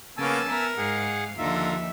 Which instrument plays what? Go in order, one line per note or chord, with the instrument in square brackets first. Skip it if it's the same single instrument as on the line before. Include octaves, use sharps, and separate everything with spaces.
[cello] C#3 [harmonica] A#3 B3 C#4 [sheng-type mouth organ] G#5 A5 E6
[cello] B3 E5 [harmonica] A#4
[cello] G#2 F5 [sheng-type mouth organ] G#4 F#5
[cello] D#2 F3 [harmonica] D3 F4 A#5 [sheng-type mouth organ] E5